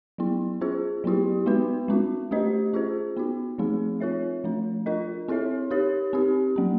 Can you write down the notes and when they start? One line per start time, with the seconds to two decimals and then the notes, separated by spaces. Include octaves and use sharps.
0.18 F#3 B3 E4
0.61 C#4 F4 G#4 C5
1.04 F#3 B3 E4 G4
1.46 G#3 B3 D#4 F#4 B4
1.88 G#3 C#4 F#4
2.31 A3 D4 G4 C5 D#5
2.73 C#4 F4 G#4 C5
3.17 B3 D#4 F#4
3.58 F3 A3 C4 D#4 G#4
4.00 C4 F4 A#4 C#5 E5
4.44 F3 A3 D4
4.86 D4 F4 A#4 D#5
5.28 C4 E4 A4 C#5 E5
5.71 D#4 G4 A#4 C#5
6.13 C4 D#4 G4
6.56 F#3 A#3 C#4